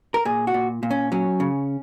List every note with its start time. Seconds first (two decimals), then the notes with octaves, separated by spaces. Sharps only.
0.14 A#4
0.25 A#2 G#4
0.47 F#4
0.54 A#2
0.83 A#2
0.91 C#4
1.12 F#3 C#4
1.40 C#3